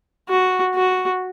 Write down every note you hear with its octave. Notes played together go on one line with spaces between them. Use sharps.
F#4
F#4